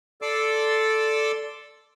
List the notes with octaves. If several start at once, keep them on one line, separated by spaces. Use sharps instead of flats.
A4 D5 C6 D6 E6